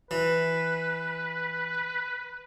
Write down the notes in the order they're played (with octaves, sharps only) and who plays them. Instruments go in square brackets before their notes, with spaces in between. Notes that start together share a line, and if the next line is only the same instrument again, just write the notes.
[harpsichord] E3 [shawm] B4